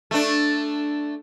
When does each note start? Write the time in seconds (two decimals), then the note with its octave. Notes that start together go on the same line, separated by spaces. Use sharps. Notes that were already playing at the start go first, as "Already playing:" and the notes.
0.11 A3 D4